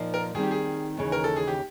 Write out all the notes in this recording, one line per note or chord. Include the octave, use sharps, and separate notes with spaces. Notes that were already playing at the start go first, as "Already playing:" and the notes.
Already playing: A#2 F3 A#3 D#4
A#4
D#3 G3 C4 G#4
G4
G#4
D#2 C#3 E3
A#4
A4
G#4
G4